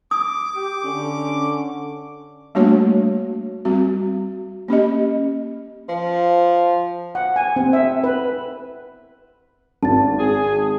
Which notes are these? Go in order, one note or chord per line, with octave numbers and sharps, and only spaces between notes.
D6 D#6
G4
D3 C#4
G3 A3 A#3 D4 F#4 C#5
G3 C4 F#4
A#3 C#4 G4 D#5
F3
F#5
G#5
C4
E5
B4
G#1 A5 A6
G#4